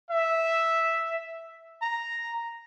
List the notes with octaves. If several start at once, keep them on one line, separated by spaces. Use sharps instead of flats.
E5
A#5